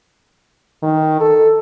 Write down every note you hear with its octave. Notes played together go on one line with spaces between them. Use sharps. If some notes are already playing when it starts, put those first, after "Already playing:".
D#3
A4